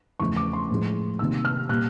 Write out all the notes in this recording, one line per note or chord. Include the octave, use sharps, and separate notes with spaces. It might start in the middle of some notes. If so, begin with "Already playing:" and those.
E2 C#3 F3 A3 C#6
D6
C6
A2 F3 G#3
C3 D#3 G3 A#3 E6
F6
A#2 G3 A#3 F#6